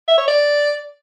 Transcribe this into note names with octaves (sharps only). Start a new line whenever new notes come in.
E5
C#5
D5